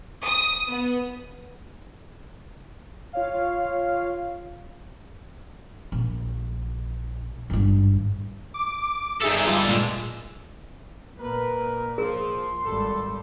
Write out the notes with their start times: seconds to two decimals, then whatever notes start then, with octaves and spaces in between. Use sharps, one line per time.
0.25 D#6
0.69 B3
3.13 F4 C#5 F5
5.92 A#1
7.50 G#1 G2
8.54 D6
9.22 G2 D#4 G#4 A4 E5
9.47 G3 F4
9.66 A#2 G#3
11.19 A#2 A#4 B4
11.98 F3 G#4 A#4 C6
12.64 G#1 G3 A4